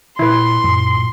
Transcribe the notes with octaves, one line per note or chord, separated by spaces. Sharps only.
A#2 E4 B4 C6
F#2 A#2